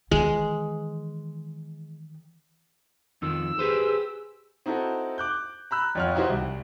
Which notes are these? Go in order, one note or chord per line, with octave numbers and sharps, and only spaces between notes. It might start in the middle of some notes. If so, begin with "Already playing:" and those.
D#3 E3 G#3
F2 D#3 F3 E6
G4 G#4 B4 C5
C4 D#4 E4 F#4 A4
D6 F#6 G6
A#5 B5 E6 F#6
F2 F4 C#5 F#5 F6
D#4 E4 F#4 G4 C5
C2